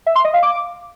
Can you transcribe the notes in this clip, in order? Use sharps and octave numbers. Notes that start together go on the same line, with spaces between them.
E5
C6
D#5
F5
D6